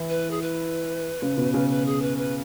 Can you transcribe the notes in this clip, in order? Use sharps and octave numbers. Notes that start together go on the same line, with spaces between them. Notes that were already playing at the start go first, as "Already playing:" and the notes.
Already playing: E3 E4
B4
G#4
B4
C#3 C#4
B2 B3
C#3 C#4
B4
G#4
B4
B4